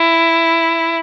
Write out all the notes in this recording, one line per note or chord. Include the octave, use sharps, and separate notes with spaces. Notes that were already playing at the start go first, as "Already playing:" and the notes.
Already playing: E4